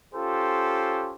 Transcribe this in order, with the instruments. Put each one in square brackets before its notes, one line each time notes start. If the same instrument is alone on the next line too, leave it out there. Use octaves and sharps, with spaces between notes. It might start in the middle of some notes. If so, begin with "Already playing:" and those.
[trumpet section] C#4 F4 G4 A4 C5